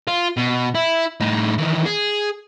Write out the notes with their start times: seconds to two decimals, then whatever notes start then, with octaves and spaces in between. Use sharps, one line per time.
0.08 F4
0.37 B2
0.75 E4
1.20 A2 D#4
1.58 D#3 E3
1.86 G#4